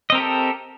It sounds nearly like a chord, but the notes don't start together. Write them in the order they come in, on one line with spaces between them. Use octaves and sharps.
D#5 C4 A#4 G4 A4